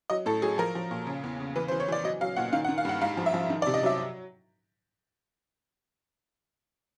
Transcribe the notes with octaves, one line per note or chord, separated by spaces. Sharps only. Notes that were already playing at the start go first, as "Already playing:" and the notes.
F#3 D#5
A2 A4
F#3 G#4
F3 A#4
F3
A#2
C#3
E2
C#3
E3 B4
C5
E3
C#5
E3 D5
F#3 D#5
F#3 F5
A#2 F#5
D#3 F5
F#5
D#3
F5
G2 F#5
G#2 F5
F3
E5
F3
D#3
D5
C3
D#5
F#3 E5